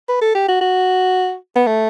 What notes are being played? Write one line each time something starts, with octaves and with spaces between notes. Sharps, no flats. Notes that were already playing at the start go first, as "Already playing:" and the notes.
B4
A4
G4
F#4
F#4
B3
A3